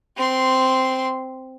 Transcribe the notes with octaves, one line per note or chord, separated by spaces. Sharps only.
C4 C6